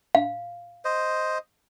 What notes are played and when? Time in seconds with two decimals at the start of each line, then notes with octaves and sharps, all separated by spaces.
0.15 F5
0.85 C5 D#5